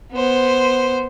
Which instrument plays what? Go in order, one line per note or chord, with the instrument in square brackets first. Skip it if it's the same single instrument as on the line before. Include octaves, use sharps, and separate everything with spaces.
[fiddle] B3 C5